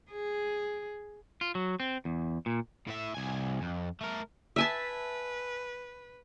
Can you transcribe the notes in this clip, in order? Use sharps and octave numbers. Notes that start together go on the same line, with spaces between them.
G#4
F4
F#3
C4
E2
A#2
A2 E5
C2 G#5
F2
A3 A#4
B4 E5 G#5 A5